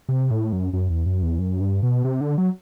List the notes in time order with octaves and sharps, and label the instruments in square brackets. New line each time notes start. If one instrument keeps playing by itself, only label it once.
[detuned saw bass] C3
A2
F#2
F#2
E2
F#2
E2
F#2
G2
B2
C3
D3
F#3